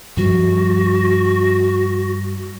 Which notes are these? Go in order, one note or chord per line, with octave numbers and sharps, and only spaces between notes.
G2 F3 G3 F#4